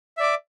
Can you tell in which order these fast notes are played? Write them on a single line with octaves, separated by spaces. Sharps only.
E5 D5 D6